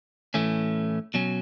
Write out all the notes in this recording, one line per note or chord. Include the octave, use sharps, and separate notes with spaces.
A2 E3 A3 C#4
B2 F#3 C#4